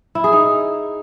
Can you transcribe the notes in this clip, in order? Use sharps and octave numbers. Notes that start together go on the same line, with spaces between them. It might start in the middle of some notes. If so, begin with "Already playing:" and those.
E4
G#4
D#4